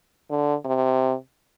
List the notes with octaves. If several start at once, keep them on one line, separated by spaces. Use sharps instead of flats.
D3
C3